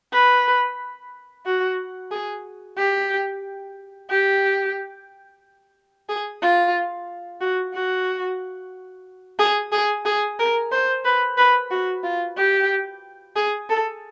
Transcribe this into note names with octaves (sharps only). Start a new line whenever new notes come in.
B4
F#4
G#4
G4
G4
G#4
F4
F#4
F#4
G#4
G#4
G#4
A#4
C5
B4
B4
F#4
F4
G4
G#4
A4